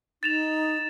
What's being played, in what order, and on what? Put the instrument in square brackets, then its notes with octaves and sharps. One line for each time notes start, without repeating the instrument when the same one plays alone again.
[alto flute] D#4 [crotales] A6 E7 F7